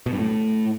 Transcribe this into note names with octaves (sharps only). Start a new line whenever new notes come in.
B2
G2
A2